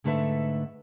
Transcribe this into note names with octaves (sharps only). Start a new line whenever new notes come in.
G#2 D3 A3 A4 B4 E5